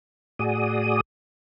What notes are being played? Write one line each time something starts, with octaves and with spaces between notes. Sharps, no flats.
A2 F#4 G#4 D5 D#6